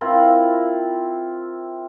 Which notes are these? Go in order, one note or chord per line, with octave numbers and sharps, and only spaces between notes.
C4 E4 F4 A#4